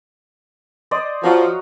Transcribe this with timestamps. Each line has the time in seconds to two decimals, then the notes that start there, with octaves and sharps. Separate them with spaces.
0.91 C5 D5 D#5
1.23 F3 F#4 C#5 A#5